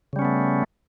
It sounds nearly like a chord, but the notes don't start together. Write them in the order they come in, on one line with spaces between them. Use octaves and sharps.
C#3 G3 C#4 B3 A3